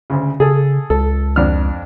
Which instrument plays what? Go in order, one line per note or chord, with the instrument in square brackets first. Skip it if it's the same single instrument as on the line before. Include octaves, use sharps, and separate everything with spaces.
[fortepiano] D2 C#3
[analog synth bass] C#3 [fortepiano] G#4 A4
[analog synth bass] C#2 [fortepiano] A4
[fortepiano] F2 D4 F6